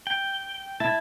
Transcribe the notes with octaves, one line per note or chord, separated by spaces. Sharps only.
G5
E4 A5